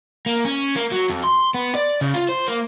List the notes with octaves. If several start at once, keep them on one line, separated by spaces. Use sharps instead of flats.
A#3
C#4
A#3
F#3
F2
C6
B3
D5
C#3
F4
C5
A#3